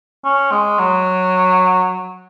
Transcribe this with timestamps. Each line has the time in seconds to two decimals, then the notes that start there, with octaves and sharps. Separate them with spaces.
0.25 C#4
0.52 G#3
0.79 F#3